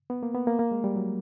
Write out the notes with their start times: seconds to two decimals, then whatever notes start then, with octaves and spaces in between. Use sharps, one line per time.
0.10 B3
0.23 A#3
0.35 B3
0.47 A#3
0.59 A#3
0.72 G#3
0.84 G3
0.96 F#3